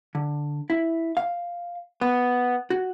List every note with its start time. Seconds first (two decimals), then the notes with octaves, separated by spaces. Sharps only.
0.15 D3
0.70 E4
1.17 F5
2.01 B3
2.70 F#4